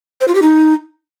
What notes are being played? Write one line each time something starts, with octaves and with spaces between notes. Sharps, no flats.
C5
F4
G4
D#4